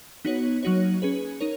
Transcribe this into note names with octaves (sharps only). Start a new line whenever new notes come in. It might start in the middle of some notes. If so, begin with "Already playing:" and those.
B3 D#4 F#4 C#5
F#3 A#3 D#4 F#4 C#5
C#4 G#4 B4
D#4 A#4 C#5